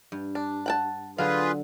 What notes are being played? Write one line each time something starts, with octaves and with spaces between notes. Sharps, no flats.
G2
D4
F#5 G5 A5
D3 F#3 F4 G#4 B4 F5